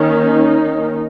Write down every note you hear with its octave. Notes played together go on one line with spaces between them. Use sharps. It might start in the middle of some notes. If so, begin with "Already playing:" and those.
Already playing: D#3 A#3 C#4 D#4